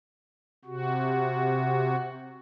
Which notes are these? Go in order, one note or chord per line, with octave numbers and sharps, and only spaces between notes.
C3 F#4